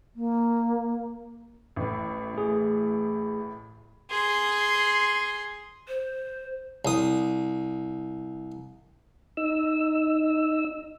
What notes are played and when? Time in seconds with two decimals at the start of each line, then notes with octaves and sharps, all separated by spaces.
0.16 A#3
1.76 A1 A2
2.34 A3 G#4
4.10 G#4 C6
5.88 C5
6.85 C2 D#6
9.37 D#4 E6